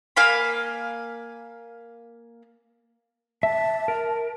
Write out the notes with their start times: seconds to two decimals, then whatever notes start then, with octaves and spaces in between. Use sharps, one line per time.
0.16 A#3 F5 G#5 B5
3.43 E5 A5
3.88 A#4